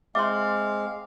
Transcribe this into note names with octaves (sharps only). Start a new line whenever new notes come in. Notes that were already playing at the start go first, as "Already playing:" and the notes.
G#3 C4 E5 F5 C6 D6